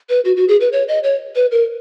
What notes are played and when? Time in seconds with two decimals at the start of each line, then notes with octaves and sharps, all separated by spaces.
0.09 B4
0.25 F#4
0.36 F#4
0.48 G#4
0.61 B4
0.72 C#5
0.88 D#5
1.04 C#5
1.35 B4
1.51 A#4